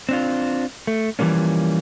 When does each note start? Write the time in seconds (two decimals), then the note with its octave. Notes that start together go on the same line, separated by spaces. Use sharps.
0.09 C4 D4 F4
0.87 A3
1.19 E3 F3 G3 A#3 C#4